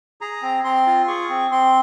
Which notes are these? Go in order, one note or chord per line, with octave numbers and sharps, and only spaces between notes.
G#4 A#5
C4
C4 C6
F4
G#4 C#6
C4
C4 C6